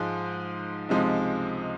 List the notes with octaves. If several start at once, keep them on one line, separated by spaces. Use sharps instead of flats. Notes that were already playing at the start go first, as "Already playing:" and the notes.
Already playing: G#2 F3 G#3
C#2 C3 F3 G#3 D#4